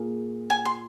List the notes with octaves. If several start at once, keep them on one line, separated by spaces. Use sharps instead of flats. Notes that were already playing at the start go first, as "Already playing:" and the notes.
Already playing: A#2 A#3 G#4
G#5
C6